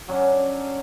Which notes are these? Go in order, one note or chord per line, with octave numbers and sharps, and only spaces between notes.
F#3 C#4 D4